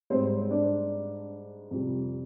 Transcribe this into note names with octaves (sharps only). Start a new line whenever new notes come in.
G#2 G3 C4 C5
D4 D5
F2 C3 G3